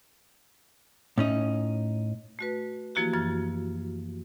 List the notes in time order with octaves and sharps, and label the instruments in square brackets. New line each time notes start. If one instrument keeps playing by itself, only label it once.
[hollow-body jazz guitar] A2 C#4 D#4
[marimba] A3 F#4 B4
E3 F3 A#3 E4 F#4 G4
F#2 E3 F6